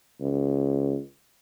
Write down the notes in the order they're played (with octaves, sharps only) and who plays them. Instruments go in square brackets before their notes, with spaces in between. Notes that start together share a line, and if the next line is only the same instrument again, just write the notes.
[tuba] C#2